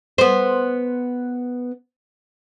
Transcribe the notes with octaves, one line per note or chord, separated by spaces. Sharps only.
B3 C5